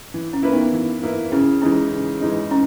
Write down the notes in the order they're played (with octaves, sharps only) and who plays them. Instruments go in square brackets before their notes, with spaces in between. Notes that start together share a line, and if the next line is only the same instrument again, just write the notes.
[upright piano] E3
[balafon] C#4
[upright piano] A#3 E4 B4
[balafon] B3 D#4
[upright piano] E3
A#3 E4 B4
[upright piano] C#3 [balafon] C#4 E4
[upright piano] E3 G#3 D#4 [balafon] C#4
[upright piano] C#3
E3 G#3 D#4
[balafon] C#4